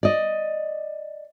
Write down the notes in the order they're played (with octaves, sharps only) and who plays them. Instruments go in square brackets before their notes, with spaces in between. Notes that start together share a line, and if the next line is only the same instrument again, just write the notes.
[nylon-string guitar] D5 D#5